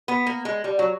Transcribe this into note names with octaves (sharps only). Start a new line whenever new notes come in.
B3
A#3
G#3
G3
F#3